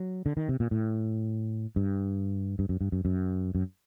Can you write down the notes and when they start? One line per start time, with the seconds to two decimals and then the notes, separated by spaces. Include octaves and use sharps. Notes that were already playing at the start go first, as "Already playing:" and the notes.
Already playing: F#3
0.26 D3
0.37 D#3
0.49 C3
0.60 A#2
0.71 A2
1.76 G2
2.59 G2
2.69 F#2
2.81 G2
2.92 F#2
3.05 F#2
3.55 F#2